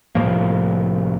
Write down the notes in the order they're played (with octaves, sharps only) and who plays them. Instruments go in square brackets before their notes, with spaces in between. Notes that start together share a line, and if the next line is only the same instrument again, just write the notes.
[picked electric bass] C2 A2 F3 A#3